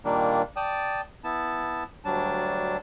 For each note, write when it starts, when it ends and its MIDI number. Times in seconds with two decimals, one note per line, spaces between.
0.05 0.42 46
0.05 0.42 51
0.05 0.42 55
0.05 0.42 58
0.05 0.42 62
0.56 1.01 74
0.56 1.01 79
0.56 1.01 81
0.56 1.01 87
1.24 1.84 59
1.24 1.84 64
1.24 1.84 81
2.05 2.77 38
2.05 2.77 54
2.05 2.77 55
2.05 2.77 62
2.05 2.77 81